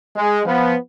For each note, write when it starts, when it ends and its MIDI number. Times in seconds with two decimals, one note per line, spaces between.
0.16 0.40 56
0.45 0.75 53
0.45 0.75 59